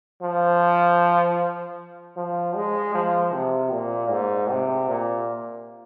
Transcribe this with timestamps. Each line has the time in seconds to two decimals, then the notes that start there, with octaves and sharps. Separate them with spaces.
0.22 F3
2.17 F3
2.56 G#3
2.95 F3
3.33 C3
3.72 A#2
4.10 G#2
4.50 C3
4.89 A#2